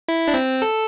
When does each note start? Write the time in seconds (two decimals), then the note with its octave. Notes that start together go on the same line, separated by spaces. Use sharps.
0.08 E4
0.28 D4
0.34 C4
0.62 A4